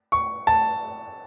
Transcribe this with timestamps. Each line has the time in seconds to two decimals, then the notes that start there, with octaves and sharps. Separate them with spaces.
0.12 C#6
0.47 A5